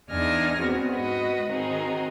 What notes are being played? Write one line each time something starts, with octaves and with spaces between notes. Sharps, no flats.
E2 D4 D#4 G#5 F6 A#6
B3 C4 F#4 G#4
G#2 F#4 B4 D#5
D#3 C4 D#4 F#4 G#4